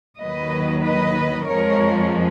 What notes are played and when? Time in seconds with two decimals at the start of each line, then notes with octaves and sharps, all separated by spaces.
0.21 D#2 D#3 F#3 B4 D#5
0.85 B4 D#5
1.48 F2 F3 G#3 A#4 C#5